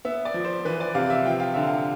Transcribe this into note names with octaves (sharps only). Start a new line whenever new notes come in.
B3 E5
D5
F3
C5
E3 B4
D5
C3 F5
E5
F3 G5
F5
D3 E5
F5